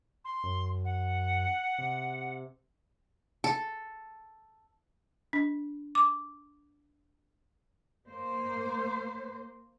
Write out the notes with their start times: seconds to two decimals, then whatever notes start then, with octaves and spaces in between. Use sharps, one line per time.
0.25 C6
0.44 F#2
0.85 F#5
1.78 C3
3.44 A4
5.33 D4
5.95 D6
8.07 A#3 C5